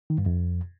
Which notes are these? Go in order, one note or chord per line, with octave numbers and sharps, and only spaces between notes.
D#3
G2
F2